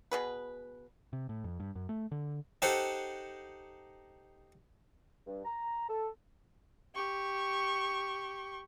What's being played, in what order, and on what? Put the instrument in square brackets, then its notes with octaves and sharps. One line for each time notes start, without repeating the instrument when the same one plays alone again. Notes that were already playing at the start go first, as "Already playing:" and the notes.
[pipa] B2 G#4 B4
[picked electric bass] C3
A2
F2
G2
F#2
A3
D3
[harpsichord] D#4 G4 A4 C5 F#5
[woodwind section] G2
A#5
A4
[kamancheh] G4 C#6